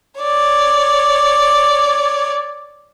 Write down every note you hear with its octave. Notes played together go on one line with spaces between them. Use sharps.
C#5 D5